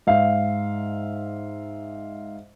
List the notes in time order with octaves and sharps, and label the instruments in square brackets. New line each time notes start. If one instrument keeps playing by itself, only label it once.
[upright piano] G#2 E5 F5